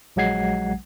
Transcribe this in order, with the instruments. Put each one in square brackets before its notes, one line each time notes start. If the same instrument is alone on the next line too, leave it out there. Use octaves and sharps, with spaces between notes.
[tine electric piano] A#1 F#3 G#3 F#5 G#6 C7